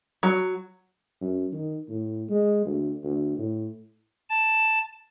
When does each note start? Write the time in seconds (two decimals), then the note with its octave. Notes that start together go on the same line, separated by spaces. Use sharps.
0.23 F#3
1.21 F#2
1.53 D#3
1.89 A2
2.29 G#3
2.66 D2
3.04 D2
3.38 A2
4.30 A5